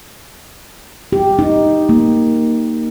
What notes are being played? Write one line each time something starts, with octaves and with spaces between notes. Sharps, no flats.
G4
D#4
A#3